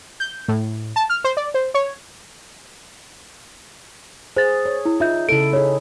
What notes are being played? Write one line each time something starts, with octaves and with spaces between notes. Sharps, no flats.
G6
A2
A5
F6
C5
D5
C5
C#5
G#4 C5 A6
C#5
E4
D#4 F4 E5 G6
C#3 E4 A4 D7
D#4 G#4 C#5